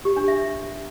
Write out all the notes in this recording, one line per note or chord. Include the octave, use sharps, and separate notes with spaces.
G4
D4
E5